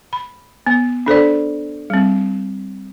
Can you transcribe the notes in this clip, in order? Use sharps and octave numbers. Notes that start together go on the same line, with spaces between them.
B5
B3
D4 A4 C5 D5
G3 C4